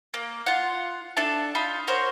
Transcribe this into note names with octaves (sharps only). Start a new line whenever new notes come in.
A#3
F4 F#5
D4 A4 E5 A5
D#4 F4 B5
F#4 A#4 C5 C#5